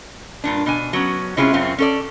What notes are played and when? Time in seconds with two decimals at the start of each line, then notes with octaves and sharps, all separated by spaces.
0.44 G2 A#2 D4
0.66 B2 D4 G#5
0.93 F#3 B3 C#4
1.37 C3 G#3 C#4 E4 F4 G#4
1.53 F#2 C4 C#4 F4
1.78 C#4 A4 D5